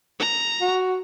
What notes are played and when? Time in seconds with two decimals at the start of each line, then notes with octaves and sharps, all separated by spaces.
0.20 A#5
0.61 F#4